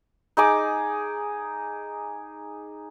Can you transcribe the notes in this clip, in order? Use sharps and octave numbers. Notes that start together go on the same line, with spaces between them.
D#4 G#4 D6